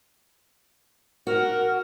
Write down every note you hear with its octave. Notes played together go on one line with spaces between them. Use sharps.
F#4 A#4